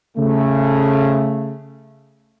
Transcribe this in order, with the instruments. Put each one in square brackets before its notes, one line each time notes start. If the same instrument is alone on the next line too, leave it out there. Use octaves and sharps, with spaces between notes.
[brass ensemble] C#3 A3